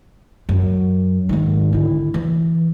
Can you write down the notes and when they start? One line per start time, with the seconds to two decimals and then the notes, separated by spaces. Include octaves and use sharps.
0.49 F#2
1.29 G#2 D#3
1.72 D3 E4
2.14 E3